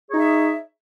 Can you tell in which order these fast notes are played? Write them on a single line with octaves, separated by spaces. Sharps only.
G#4 C#5 D#4 E5